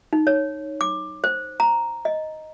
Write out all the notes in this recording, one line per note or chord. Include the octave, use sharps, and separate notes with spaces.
D#4
C#5
D6
C5
A#5
D#5